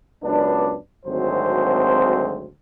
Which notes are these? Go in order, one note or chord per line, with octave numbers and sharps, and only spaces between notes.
C#2 F#2 B3 D4
G#1 D2 F#3 G#3 C4 C5